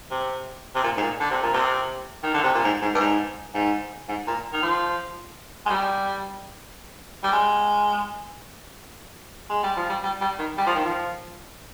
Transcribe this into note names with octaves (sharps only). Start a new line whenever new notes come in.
C3
C3
A#2
G#2
A#2
D3
C3
A#2
C3
D#3
D3
C3
A#2
G#2
G#2
G2
G#2
G#2
G#2
A#2
D#3
F3
G#3
G3
G3
G#3
G#3
G3
F3
G3
G3
G3
D#3
G3
F3
D#3
F3